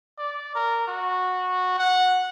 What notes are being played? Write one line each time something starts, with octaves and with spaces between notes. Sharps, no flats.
D5
A#4
F#4
F#5